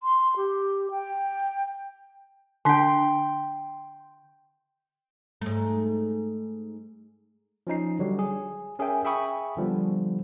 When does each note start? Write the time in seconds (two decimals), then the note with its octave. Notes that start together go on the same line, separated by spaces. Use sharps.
0.03 C6
0.37 G4
0.91 G5
2.65 D3 D4 G5 C6
5.41 G#2 A3
7.67 F3 C#4 D#4 C7
7.99 D3 F#3 G3
8.19 G#4
8.79 C#4 G#4 A#4 E5 G5 G#5
9.04 G#4 E5 G5 B5 C#6 D#6
9.57 D3 F3 G3 B3